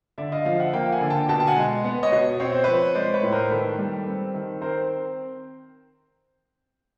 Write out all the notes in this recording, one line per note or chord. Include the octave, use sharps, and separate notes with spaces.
D3 D5 E5
D#5 F5
F3 D#5 F5
E5 F#5
A#3 F5 G5
F#5 G#5
D3
G5 A5
B2 G5 A5
A5
F#5 G#5
G#3
B3
C#5 D#5
B2
C4 C#5
C5
F3 B4 C#5
G#3 C5 D5
B4 C#5
A2
A#4 C5
D#3 A4 B4
G3
C4
D#3
C4 A#4 C5